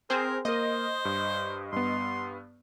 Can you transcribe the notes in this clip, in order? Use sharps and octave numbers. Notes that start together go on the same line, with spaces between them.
C4 G#4 A#4 C5
A#3 A#4 C5 D#5
G2
G2 B3 C6